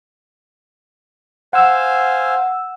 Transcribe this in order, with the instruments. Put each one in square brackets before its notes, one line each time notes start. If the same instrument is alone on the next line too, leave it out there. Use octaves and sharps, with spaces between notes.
[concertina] C5 F5 G#5 [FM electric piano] F#5 E6